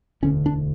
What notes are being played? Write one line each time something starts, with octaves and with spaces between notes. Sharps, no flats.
E1 D2 D3 C#4
D4